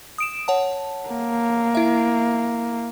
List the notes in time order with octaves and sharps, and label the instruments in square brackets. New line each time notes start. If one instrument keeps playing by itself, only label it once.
[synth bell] D#6 D7 E7
C#5 F#5 A5
[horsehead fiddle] A#3
[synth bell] E4 E5